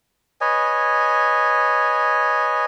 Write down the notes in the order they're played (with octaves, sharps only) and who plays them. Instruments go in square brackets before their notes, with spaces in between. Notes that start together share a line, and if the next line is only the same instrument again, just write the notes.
[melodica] B4 C#5 D#5 G#5